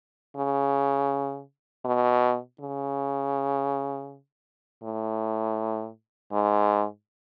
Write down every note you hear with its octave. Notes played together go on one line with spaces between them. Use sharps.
C#3
B2
C#3
A2
G#2